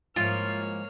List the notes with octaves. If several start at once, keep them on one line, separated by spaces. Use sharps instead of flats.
G#2 F3 A#3 E4 F4 C#5 F6